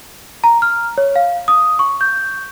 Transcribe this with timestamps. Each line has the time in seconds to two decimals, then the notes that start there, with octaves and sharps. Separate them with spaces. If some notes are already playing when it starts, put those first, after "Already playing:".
0.44 A#5
0.62 F6
0.98 C#5
1.16 F5
1.48 D#6
1.79 C#6
2.01 G6